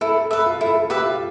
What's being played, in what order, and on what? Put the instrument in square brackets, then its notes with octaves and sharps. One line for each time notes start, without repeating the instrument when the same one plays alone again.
[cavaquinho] E4 [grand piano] A4
[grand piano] A4
[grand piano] A4 [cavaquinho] B4 E5
[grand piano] F4
[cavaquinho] E4 [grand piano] A4
[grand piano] A4
[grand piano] G4 [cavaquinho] B4 E5
[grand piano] F4